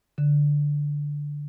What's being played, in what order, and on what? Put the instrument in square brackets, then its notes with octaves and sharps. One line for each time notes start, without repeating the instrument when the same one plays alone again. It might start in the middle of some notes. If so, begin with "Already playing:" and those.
[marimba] D3